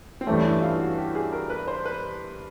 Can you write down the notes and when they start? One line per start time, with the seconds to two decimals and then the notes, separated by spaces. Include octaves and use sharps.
0.21 C4
0.27 G2 E3 A3 C#4
0.44 E4
0.62 F4
0.80 F#4
0.98 G4
1.15 G#4
1.32 A#4
1.50 B4
1.68 C5
1.85 B4